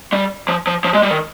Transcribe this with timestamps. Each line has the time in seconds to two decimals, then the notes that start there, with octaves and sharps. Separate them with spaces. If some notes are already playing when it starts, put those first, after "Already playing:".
0.13 G3
0.48 F3
0.67 F3
0.84 F3
0.94 G#3
1.03 G3
1.11 D#3